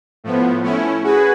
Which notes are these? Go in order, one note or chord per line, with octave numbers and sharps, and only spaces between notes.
A2 F3 B3
A3 C#4 E4
F#4 G#4 B4